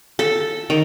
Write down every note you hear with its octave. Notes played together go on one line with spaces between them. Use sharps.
A4
D#3